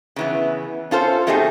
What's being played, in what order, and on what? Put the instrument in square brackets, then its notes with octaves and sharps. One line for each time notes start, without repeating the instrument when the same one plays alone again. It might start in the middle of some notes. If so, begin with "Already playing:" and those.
[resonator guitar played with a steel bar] C#3 E3 B3
C#4 F4 A4 C5
B2 A3 C4 D#4 G4 G#4